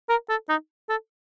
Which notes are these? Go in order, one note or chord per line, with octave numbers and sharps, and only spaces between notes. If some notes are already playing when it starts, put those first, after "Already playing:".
A#4
A4
D#4
A4